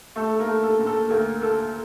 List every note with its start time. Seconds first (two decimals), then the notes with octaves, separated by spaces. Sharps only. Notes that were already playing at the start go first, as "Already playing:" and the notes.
0.16 A3 A4
0.29 A4
0.40 A#3 A#4
0.47 A3
0.63 A4
0.79 A#2
0.87 A4
1.10 D2 A#3 A#4
1.42 A#3 A4